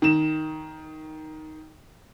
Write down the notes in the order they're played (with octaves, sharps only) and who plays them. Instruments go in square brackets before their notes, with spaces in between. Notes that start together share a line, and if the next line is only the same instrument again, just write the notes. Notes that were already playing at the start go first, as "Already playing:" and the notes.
[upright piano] D#3 E7